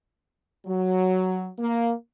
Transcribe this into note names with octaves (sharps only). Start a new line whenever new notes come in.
F#3
A#3